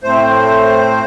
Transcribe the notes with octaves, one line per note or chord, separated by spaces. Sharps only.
A2 A3 C4 C5